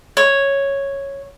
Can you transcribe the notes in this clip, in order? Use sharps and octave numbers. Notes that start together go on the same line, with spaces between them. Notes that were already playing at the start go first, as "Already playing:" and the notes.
C#5